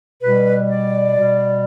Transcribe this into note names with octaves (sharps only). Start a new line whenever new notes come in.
B2 G3 B4
D5
B2 G3